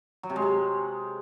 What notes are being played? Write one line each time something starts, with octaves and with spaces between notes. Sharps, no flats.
F#3
C3
G#3
C3